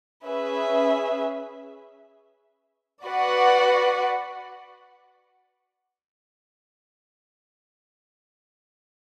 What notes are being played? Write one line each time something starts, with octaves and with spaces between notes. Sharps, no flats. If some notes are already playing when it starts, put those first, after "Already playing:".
C#4 G#4 B4 E5
F#4 B4 D5 F#5